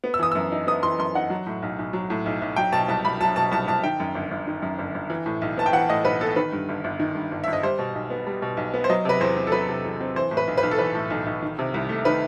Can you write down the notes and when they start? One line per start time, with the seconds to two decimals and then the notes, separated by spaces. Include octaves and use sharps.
0.04 B3
0.14 E6
0.19 E3 D#6
0.32 F#2 E6
0.52 D#4
0.67 B3 D#6
0.83 E3 C6
0.98 F#2 C6
1.15 D#4 F#5
1.30 F#3
1.47 A2
1.62 B1
1.79 B1
1.93 F#3
2.10 A2
2.26 B1
2.42 B1
2.56 F#3 G5
2.72 B2 A5
2.88 C2 A5
3.05 C2 B5
3.21 F#3 A5
3.36 B2 A5
3.51 C2 A5
3.67 C2 A5
3.84 D#3 G5
4.00 F#2
4.15 G1
4.31 G1
4.47 D#3
4.62 F#2
4.79 G1
4.95 G1
5.10 E3
5.26 A2
5.42 B1
5.57 B3 A5
5.66 G5
5.73 E3 F#5
5.89 A2 D#5
6.05 B1 B4
6.21 B3 A4
6.36 D#3 B4
6.52 G2
6.69 G1
6.84 G1
7.00 D#3
7.15 G2
7.32 G1
7.44 G1 E5
7.53 D#5
7.63 G3 C5
7.79 B2
7.95 B1
8.10 B3
8.27 G3
8.42 B2
8.57 B1
8.74 B3
8.84 C5
8.89 F#3 D#5
9.05 C3 B4
9.20 E2 C5
9.37 C4
9.47 A4
9.52 F#3 B4
9.69 C3
9.85 E2
10.01 C4
10.16 E3 C5
10.31 A2
10.37 B4
10.47 B1
10.58 B4
10.63 B1
10.71 A4
10.78 E3 B4
10.95 A2
11.10 B1
11.26 B1
11.42 D#3
11.59 C3
11.74 C2
11.89 A3
12.05 D#3 B4